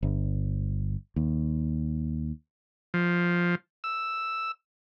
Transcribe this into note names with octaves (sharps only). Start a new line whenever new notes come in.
G1
D#2
F3
E6